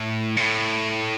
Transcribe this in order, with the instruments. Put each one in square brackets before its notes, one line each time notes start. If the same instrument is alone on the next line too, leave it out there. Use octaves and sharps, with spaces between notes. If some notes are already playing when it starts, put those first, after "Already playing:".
Already playing: [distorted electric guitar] A2
A#2
A2